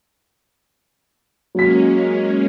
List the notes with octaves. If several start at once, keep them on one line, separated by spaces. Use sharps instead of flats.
F#3 G#3 A#3 C#4 B6